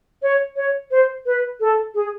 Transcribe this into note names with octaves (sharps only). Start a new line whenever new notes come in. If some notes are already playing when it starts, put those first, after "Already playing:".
C#5
C#5
C5
B4
A4
G#4